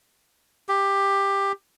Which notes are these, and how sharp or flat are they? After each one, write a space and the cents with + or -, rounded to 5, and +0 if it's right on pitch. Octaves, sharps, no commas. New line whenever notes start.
G4 +15